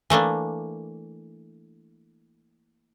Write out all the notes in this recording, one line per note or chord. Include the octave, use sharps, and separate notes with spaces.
E3 A3 A#3 D4